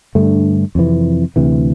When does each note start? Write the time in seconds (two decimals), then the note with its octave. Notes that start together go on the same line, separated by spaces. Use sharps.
0.15 G2 D3 A3
0.75 F2 C3 E3
1.36 D2 C3 E3